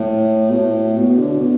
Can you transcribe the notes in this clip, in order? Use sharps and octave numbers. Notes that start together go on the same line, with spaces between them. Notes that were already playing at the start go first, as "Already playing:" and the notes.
Already playing: A2
B2
A2
B2
D3
B2